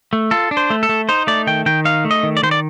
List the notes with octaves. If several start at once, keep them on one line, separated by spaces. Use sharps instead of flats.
A3
F4 A4
D4
C5
A3
A4
A3
D#4 C5
A3 D5
D#3 G5
D#3 G5
D#4 F5
A3
D#5
D#3
D5
D#3 C5
D5